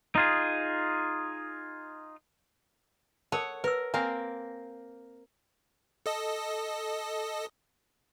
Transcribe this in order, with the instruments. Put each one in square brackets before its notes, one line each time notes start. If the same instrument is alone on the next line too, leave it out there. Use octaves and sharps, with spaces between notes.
[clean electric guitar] D#4 F4 G#4
[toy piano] A4 A#4 A5 [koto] C#5 F#5
[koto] A#4 [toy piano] B4 E6
[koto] A#3 C4 A#4 [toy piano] G#5
[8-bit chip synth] A4 D#5